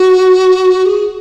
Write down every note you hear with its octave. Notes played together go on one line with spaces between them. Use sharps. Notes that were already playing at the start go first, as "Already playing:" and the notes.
Already playing: F#4
G#4